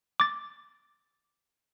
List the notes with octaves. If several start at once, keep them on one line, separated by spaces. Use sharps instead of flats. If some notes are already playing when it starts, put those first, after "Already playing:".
D6 A6